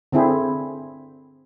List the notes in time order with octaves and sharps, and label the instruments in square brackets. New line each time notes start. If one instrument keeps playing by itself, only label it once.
[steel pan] D3 C4 E4 G#4